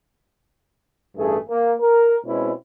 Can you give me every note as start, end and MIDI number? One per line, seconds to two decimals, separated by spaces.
1.17 1.37 33
1.17 1.37 43
1.17 1.37 57
1.17 1.37 68
1.49 1.73 58
1.82 2.16 70
2.26 2.52 47
2.26 2.52 56
2.26 2.52 60
2.26 2.52 61
2.26 2.52 64